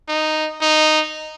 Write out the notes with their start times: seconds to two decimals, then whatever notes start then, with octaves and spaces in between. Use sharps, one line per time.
0.08 D#4
0.62 D#4